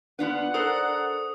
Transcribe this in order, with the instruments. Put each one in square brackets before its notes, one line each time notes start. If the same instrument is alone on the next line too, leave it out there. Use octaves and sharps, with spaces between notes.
[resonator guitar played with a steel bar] B3 F4 B4 [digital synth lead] D4 [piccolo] F#5
[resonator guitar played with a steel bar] A4 A#4 C5 [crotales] D#6